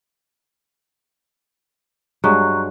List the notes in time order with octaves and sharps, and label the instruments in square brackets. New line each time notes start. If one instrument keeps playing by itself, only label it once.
[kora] G2 F#3 G#3 [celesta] A#5 C#6 F#6